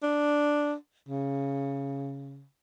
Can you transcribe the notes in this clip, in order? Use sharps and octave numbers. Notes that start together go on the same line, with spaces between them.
D4
C#3